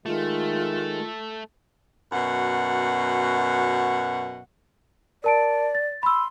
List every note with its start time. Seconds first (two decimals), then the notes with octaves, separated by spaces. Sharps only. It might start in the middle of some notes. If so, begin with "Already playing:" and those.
0.06 D#3 G#3 A3 F4
2.12 F#2 B2 F#5
5.24 A#4 D5 A5 D7
5.75 A6
6.03 B5 C6 E6